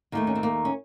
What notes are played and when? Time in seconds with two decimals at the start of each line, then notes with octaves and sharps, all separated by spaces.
0.12 D#2 D#3 A3 A#3
0.27 C#4
0.35 C4
0.43 A#3
0.65 C#4